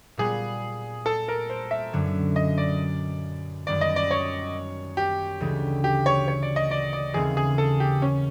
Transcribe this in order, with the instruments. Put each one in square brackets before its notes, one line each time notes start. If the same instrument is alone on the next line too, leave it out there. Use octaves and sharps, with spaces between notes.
[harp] A#2 G3 B3 [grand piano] G#4
[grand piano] A4
A#4
C5
E5
[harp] F#2 D3 F#3
[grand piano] D#5
D5
[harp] F#2 D#3 G3 B3 [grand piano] D5
[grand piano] D#5
D5
C#5
G4
[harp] D2 C#3 E3 G#3
[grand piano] G4
C#5
C#5
D5
D#5
D5
D5
[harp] D#2 C#3 E3 A3 C4 [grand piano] G#4
[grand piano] G#4
A4
G4
C#4